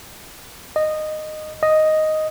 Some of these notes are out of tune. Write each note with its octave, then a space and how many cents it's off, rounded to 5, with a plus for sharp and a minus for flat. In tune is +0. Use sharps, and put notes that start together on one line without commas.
D#5 -15
D#5 +0